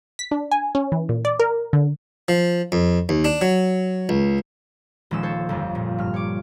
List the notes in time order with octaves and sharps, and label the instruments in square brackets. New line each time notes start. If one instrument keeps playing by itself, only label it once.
[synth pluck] B6
D4
G#5
C#4
E3
A#2
D5
A#4
D3
[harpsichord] F3
F2
D#2
D4
F#3
C#2
[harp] D#1 F3 G#3 C#4 E6 E7
A4 C5 C#5
G1 F2
A#2
G2 F6
C#5 D6